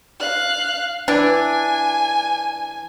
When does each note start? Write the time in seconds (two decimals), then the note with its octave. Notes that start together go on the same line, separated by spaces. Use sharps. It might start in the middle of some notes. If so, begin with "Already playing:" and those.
0.20 F5 F#6
1.08 E3 D4 G#5